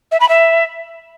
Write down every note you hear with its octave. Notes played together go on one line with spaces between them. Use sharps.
E5
B5
E5